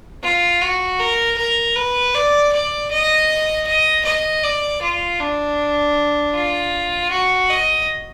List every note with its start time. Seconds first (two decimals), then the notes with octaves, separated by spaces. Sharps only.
0.24 F4
0.62 F#4
1.00 A#4
1.38 A#4
1.76 B4
2.15 D5
2.53 D5
2.91 D#5
3.67 D#5
4.05 D#5
4.44 D5
4.82 F4
5.20 D4
6.35 F4
7.11 F#4
7.50 D#5